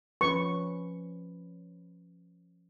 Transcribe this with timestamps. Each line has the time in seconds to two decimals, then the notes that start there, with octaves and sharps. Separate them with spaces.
0.21 F3 C#4 B4 C#6